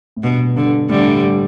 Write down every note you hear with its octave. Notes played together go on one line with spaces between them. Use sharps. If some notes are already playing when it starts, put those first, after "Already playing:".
A2
G2 B2
G2 D3
A2 D3 G3
G2
A2
G3